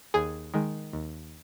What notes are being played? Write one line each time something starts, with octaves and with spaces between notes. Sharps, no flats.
D#2 G#4
D#3 G#3
D#2